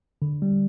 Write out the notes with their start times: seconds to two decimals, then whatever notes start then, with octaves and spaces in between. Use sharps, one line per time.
0.22 D3
0.42 G3